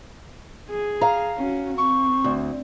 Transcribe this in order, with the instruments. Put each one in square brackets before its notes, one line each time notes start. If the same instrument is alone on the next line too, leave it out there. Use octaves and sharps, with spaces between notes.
[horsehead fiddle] G#4
[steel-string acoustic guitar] F5 A#5
[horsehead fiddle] C#4 F#4
[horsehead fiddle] C4 [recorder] C#6
[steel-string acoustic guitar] D2